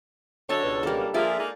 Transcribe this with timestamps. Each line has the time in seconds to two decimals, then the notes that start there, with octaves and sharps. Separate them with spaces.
0.49 F#2 D3 D4 A4 C#5 D#5 A5
0.63 C#2 B2
0.83 G3 A#3 A4
1.14 F3 A#3 F4 G#4 D5 E5
1.37 G#3 A#3 D#4